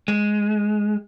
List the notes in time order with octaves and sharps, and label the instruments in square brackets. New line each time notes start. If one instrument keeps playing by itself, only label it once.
[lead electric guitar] G#3